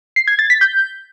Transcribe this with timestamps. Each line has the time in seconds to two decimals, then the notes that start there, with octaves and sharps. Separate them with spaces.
0.16 C7
0.28 G#6
0.39 A6
0.50 B6
0.61 G6